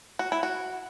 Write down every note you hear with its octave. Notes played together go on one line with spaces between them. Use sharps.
F#4
E4
F#4